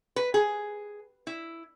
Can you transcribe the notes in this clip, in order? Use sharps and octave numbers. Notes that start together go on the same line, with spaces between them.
B4
G#4
E4